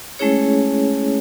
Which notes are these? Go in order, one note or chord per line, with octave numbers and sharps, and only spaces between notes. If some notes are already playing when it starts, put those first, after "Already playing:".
G#3 A3 C#4 E4 G#4 C#5